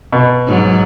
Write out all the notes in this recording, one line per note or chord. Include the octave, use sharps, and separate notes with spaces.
B2
G#2 F#3